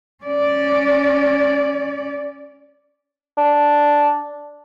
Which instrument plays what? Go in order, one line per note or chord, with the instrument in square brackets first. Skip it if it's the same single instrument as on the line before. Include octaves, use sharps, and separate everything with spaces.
[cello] C#4 D5
[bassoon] D4